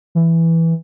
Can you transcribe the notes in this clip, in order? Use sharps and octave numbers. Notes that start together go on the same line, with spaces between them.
E3